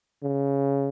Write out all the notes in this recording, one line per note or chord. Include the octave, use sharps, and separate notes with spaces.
C#3